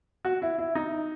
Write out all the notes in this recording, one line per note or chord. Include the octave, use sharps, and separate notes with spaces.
F#4
E4
E4
D#4